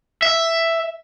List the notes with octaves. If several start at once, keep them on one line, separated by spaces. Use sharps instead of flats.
E5